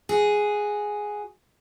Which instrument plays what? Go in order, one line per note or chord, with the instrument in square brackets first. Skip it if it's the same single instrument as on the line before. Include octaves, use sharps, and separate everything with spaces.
[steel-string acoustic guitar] F#4 G#4